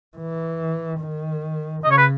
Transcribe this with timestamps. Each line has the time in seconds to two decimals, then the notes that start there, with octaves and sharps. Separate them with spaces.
0.17 E3
1.00 D#3
1.84 C#3 D#5
1.91 C#5
1.98 B4